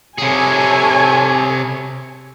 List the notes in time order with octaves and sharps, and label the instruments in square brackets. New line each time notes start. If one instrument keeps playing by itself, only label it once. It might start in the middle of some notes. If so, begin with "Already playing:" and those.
[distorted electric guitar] C3 G#4 [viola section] A4 C#5 G#5